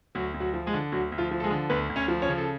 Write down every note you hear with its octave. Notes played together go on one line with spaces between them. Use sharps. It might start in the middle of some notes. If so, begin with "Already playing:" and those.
D2 F#3 F#4
D2
F#3 F#4
F3
G#3 G#4
D3
D2 F#3 F#4
D2
F3 F4
F3
A4
G#3 G#4
D3
D2 B3 B4
D2
C#4 C#5
F3
C#4 C#5
C#3
A4